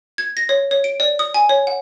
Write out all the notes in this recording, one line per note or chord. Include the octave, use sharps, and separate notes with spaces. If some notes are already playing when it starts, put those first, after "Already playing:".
G#6
A#6
C#5
C#5
D7
D5
D#6
G#5
C#5
F#5